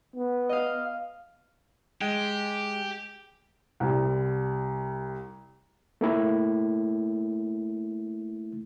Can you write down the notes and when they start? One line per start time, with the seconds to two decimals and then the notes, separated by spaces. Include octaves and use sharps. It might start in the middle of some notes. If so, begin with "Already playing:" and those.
0.16 B3
0.49 D#5 F5
2.01 G#3 G4
3.80 C2 G3
6.01 A3 A#3 E4